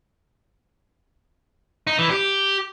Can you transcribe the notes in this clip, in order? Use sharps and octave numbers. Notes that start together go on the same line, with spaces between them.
D#4
E3
G4